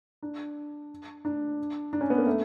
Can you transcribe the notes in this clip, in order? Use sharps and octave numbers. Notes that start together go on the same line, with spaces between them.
D4
D4
D4
C#4
B3
A#3
A3